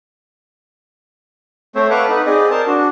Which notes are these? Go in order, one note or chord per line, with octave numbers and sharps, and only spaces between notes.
A3 C4 C5 C#5 E5
A4 B4 F5 F#5 C#6 D6
D#4 B4 F#5
C4 G#4 D5 D#5
A#4 C5 A5
D4 F#4